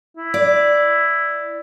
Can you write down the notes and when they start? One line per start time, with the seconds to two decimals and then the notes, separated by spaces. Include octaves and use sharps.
0.17 E4
0.34 D5